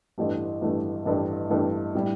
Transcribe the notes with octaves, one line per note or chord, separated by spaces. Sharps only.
A1 G2 E3 A3 G4
A1 G2 E3 A3 G4
A1 G2 E3 A3 G4
A1 G2 E3 A3 G4
A2 G3 E4